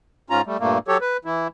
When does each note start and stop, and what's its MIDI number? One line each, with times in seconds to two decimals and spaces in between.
0.30 0.42 44
0.30 0.42 61
0.30 0.42 65
0.30 0.42 82
0.46 0.57 55
0.46 0.57 57
0.60 0.78 43
0.60 0.78 46
0.60 0.78 57
0.60 0.78 58
0.88 0.98 54
0.88 0.98 67
0.88 0.98 69
0.88 0.98 73
1.01 1.17 71
1.25 1.48 52
1.25 1.48 64